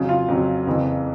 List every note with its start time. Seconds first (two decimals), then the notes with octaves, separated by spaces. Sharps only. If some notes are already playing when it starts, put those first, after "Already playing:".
Already playing: F2 C#3 F#3
0.09 F4
0.28 F2 C#3 F#3
0.66 F#1 F2 C#3 E3